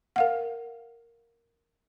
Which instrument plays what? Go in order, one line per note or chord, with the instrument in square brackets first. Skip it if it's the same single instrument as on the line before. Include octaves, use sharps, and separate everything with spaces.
[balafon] A#4 F5 F#5